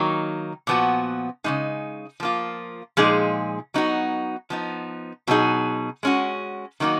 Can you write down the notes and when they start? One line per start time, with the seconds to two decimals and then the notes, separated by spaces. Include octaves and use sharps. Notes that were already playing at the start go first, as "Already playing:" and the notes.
Already playing: D#3 F#3 A#3 D#4
0.67 A#2 F3 B3 F#4
1.44 C#3 F3 G#3 D#4
2.20 F3 A#3 F4
2.97 A#2 F3 G#3 D#4 G#4
3.74 F#3 B3 D#4 F#4
4.50 F3 B3 D#4
5.27 B2 F#3 B3 D#4 G#4
6.03 G#3 C#4 F#4
6.80 D#3 F#3 A#3 D#4 F#4